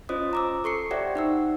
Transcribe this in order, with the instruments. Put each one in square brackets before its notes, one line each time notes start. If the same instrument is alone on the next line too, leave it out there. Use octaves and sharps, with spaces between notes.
[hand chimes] C#4 F4 C5 D#5 D#6
A#5 D6 E6
A4 C#6 C7 C#7
G4 C5 D5 E5 F#5 G5
D#4 F#5 E6